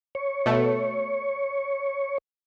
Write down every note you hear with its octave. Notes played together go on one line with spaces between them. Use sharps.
C#5
B2 A3